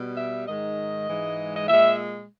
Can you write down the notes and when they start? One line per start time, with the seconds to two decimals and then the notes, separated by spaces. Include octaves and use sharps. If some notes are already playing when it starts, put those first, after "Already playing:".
Already playing: B2 G3
0.18 E5
0.47 G#2 D#3 G#3 D#5
1.08 G#2 E3 G#3
1.57 D#5
1.69 A#2 G#3 E5